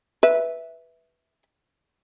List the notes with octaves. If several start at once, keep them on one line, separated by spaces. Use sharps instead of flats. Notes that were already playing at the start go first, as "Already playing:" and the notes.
B4 E5